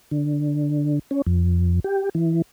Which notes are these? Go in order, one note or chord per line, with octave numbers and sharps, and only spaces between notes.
D3
C#4
F2
G4
E3